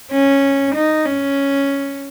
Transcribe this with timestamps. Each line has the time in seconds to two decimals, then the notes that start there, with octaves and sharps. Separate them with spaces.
0.12 C#4
0.75 D#4
1.06 C#4